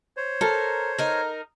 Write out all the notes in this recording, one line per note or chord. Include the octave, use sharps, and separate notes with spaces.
C5 C#5
A4 A#4
D#4 A#4